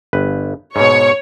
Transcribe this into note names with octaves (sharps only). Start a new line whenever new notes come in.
G1 B4
G#2 B2 C#5